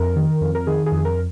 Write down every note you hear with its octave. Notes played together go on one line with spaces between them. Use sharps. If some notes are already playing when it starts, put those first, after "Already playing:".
Already playing: F2 A#4
D#3
F2
A#4
D#3 G#4
G#4
F2
A#4